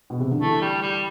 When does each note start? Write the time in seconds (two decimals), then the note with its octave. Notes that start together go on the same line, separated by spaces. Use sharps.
0.10 B2
0.20 C3
0.31 D3
0.40 E3 A3
0.61 G3
0.82 G3